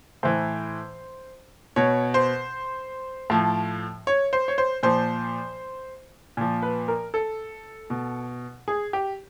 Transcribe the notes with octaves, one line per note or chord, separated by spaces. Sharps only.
A2 E3 C5
B2 C#5
C5
A2 F3
C#5
C5
C#5
C5
A#2 F3 C5
A#2 F3
B4
A#4
A4
B2
G#4
G4